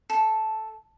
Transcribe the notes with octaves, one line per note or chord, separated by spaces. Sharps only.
A4